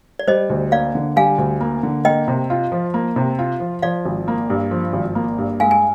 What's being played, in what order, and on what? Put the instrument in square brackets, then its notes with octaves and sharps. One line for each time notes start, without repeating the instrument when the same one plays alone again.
[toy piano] D5
[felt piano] G3 [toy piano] C5 D#5
[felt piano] D2
[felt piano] A#3 [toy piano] D5 F5
[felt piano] D3
[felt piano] G3 [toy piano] F5 G#5
[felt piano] D2
A#3
D3
[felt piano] A#3 [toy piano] D#5 G5
[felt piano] C3
F4
F3
A#3
C3
F4
F3
[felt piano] F3 [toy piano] D5 F5
[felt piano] G#1
A#3
G2
F3
G#1
A#3
G2
[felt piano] G#3 [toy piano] F5 G#5
[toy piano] G#5